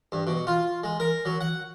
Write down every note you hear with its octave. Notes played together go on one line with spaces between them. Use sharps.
G2
B2
F4
G#3
A#4
F#3
F#5